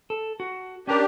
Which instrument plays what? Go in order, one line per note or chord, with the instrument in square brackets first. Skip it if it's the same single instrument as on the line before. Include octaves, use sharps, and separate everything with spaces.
[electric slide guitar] A4
F#4
[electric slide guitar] C#4 A#4 [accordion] D4 G4